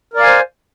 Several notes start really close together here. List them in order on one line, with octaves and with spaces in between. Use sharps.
A#4 D5 F5 G#5 C5